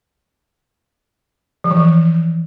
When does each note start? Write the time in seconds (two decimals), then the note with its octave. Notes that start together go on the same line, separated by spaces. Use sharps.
1.64 F3
1.71 E3
1.77 F3